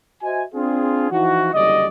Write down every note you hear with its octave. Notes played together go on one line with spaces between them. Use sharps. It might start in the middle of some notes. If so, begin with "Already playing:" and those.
F#4 C5 D#5 E5 G#5
C4 D4 F4 G#4
E3 F3 D#4 E4 F#4
F#1 E2 D3 G3 D5 D#5